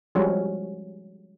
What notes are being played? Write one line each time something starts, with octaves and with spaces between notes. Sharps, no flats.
F3 G3 G#3 C#4 F#4